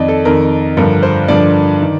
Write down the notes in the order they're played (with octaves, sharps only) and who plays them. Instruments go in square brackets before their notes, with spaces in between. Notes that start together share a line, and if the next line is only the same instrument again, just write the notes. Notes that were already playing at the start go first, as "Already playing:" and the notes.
Already playing: [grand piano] F2 D#3 D5 D#5
A4
F2 D#3 A#4
G2 D3 F3 A#4
C5
G2 D3 F3 D5
D#3